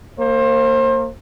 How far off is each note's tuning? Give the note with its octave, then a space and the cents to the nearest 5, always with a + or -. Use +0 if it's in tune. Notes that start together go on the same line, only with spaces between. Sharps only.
A#3 -20 C5 +30